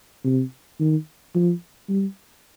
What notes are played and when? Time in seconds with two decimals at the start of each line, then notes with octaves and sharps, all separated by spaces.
0.25 C3
0.79 D#3
1.35 F3
1.89 G3